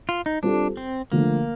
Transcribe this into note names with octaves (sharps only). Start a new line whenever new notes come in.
F4
D#4
G3 C4 D4 F4 A4
C4
D3 F3 A3 A#3